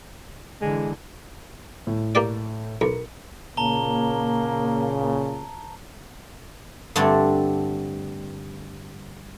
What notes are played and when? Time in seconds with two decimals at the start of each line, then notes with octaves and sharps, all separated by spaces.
0.62 D3 E3 G#3
1.87 A2
2.15 A#3 G4 D5
2.81 B1 A#4 C#7
3.57 A#2 C#3 A#3 A5 A#5 G7
6.96 G2 D3 A3 C4 D4